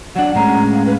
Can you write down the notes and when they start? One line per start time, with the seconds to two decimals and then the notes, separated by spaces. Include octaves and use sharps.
0.16 F#3 D4 F#5
0.35 A2 G#3 C#4 A#5
0.73 F5
0.86 B4